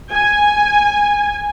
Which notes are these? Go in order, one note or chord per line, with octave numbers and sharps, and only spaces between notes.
G#5